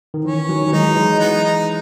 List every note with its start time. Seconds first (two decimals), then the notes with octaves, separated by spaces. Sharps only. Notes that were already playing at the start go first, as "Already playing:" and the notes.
0.14 D#3
0.25 E3 C#4
0.49 D#3 F#3
0.68 F#3
0.72 E3 G#3 D#4
0.88 F#3
0.96 E3 G#3
1.20 B3 D#4
1.43 D#4